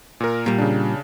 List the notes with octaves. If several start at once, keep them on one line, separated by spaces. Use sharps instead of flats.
A#2 A#4
A#2 G3
C#3 D4